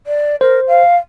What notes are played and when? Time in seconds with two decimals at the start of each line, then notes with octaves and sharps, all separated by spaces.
0.07 D5
0.41 A#4 C5
0.68 F5